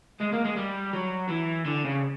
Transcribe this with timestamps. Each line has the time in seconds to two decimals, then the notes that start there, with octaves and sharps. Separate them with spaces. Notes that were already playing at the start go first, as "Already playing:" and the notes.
0.20 G#3
0.32 A#3
0.44 G#3
0.56 G3
0.93 F#3
1.29 E3
1.65 D3
1.85 C#3